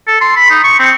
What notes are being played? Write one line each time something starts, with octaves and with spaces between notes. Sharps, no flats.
A4
C6
B5
D#4
C#6
C4